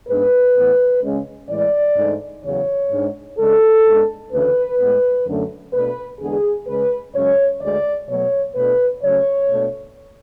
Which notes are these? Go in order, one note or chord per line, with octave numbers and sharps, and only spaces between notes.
G#2 G#3 B3 D4 B4
A2 E3 B3
C#3 G#3 C#4
A2 E3 G#3 D5
G#2 E3 A3 D4
E2 C#3 F#3 C#5
G#2 G#3 D4
C#3 G#3 D4 A4
G#2 G#3 B3 D4
D2 C#3 E3 A3 B4
A2 G#3 B3
F#2 D3 A3
B2 A3 D4 B4
E2 D3 G#3 B3 D4 G#4
C#3 G#3 C#4 B4
F#2 C#3 G#3 C#4 C#5
D2 D3 G#3 D5
B2 F#3 A3 C#5
B2 A3 D4 B4
C#3 F#3 A3 C#4 C#5
B2 A3 D4